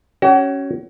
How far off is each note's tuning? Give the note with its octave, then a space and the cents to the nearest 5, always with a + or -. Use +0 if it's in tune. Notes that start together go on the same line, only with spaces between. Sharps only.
C#4 +0 F#4 +40